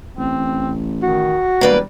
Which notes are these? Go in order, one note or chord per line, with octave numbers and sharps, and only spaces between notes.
A1 C4
D#3 F#4
E1 G3 A#3 B4 D5